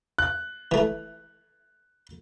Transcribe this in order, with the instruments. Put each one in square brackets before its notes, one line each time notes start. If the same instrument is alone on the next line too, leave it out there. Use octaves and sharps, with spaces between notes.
[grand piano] F#6
[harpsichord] E3 A3